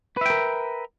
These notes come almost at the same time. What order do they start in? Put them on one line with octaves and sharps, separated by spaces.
B4 E5 G5 A#4